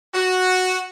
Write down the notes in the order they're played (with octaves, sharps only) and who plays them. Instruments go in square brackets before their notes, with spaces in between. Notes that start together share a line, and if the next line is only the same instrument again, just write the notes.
[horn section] F#4